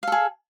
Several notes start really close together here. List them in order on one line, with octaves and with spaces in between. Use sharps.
F5 A4 G#4